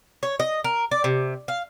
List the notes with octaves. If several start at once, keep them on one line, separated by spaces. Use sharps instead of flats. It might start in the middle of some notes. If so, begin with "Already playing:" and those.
C#5
D#5
A#4
D5
C3
F5